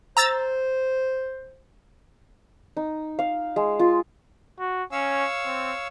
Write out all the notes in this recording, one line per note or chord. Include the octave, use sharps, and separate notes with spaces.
C5 A#5 E6 A6
D#4
F5
G#3
F4
F#4
C#4 C#5 F5 E6
C4